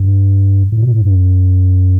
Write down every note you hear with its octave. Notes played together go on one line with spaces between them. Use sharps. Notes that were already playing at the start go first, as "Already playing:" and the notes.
Already playing: G2
A2
B2
A2
G2
F#2